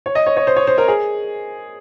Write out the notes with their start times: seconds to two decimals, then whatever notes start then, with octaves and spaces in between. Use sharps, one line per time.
0.06 C#5
0.15 D#5
0.26 C#5
0.37 C#5
0.47 C5
0.56 C#5
0.67 C5
0.78 A#4
0.88 G#4